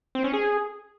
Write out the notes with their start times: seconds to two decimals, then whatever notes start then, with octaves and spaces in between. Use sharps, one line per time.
0.15 C4
0.24 C#4
0.33 G#4